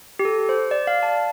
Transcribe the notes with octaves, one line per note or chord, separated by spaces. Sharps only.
G4
A4
C5
D5
F5
A5